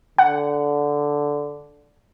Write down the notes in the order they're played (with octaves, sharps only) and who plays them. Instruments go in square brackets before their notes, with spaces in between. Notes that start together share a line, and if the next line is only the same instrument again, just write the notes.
[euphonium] D3 [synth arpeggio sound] F#5